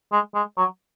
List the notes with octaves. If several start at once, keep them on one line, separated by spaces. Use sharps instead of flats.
G#3
G#3
F#3